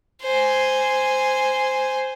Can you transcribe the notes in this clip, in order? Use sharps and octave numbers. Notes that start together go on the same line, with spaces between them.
C5 G#5